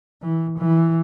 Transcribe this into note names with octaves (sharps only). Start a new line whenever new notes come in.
E3
E3